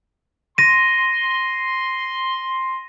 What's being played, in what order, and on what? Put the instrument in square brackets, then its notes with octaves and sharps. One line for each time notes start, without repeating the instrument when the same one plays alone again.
[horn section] C6 [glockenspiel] A#6 D#7